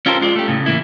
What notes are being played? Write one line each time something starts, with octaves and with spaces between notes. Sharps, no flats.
C#4 F4 G4 A4 A#4 C5
G#3 F4 D5
A3 G4
A2 C#3
E3 A#3 E4